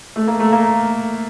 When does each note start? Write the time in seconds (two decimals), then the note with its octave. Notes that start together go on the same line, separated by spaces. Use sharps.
0.16 A3
0.28 A#3
0.40 A3
0.53 A#3